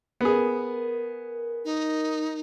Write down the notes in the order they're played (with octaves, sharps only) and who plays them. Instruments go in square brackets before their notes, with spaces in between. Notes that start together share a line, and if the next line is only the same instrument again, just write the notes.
[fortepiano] B3 G#4 [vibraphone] A#4
[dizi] D#4